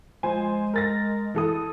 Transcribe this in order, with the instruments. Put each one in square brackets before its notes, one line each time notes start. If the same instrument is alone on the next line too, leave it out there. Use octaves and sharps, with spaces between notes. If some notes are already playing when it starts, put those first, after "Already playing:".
[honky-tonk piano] F3 C5 G#5 [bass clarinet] G#3
[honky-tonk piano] A#4 A6 A#6
E3 A4 D#6